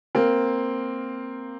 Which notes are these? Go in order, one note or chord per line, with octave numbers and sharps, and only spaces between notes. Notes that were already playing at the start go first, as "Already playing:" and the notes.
A#3 C4